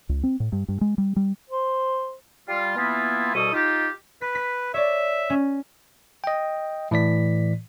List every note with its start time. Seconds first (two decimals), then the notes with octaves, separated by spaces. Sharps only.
0.09 C#2
0.23 C4
0.40 A2
0.52 G2
0.68 G2
0.81 G#3
0.98 G3
1.16 G3
1.50 C5
2.49 G3 F4
2.76 E3 A#3 B3 E4 F4
3.34 C2 B2 G3 A4 D#6
3.53 D#4 F4 G4
4.21 B4 B6
4.35 B6
4.74 C#5 D5 E5
5.30 C#4
6.24 D#5 G5
6.91 A2 E3 D5 B6